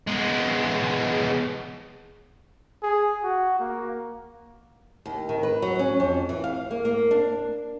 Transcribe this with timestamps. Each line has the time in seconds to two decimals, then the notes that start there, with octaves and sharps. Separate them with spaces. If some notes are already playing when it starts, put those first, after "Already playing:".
0.07 G#3 B3
2.83 G#4
3.24 F#4
3.59 A#3
5.06 D#2
5.29 D#3
5.43 B4
5.62 F#3
5.79 C#4
6.00 F2
6.29 E3
6.44 F5
6.71 A#3
6.85 A#3
7.11 D4